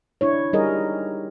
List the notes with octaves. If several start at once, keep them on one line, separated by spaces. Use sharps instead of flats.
D4 E4 C#5
G3 D#4 G#4 A#4 D#5